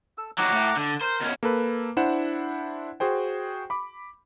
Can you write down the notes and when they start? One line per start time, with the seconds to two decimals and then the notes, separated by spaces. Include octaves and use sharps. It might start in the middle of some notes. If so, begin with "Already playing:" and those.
0.18 A4 E6
0.38 D#3 F#3 F#5 A#5 D6
0.52 A2
0.76 D3
1.01 A#4 C5
1.21 B2 C#4
1.43 A#3 A4 B4
1.97 D4 E4 C5 F#5 E7
3.00 F#4 G#4 C5 G5
3.70 B5 D6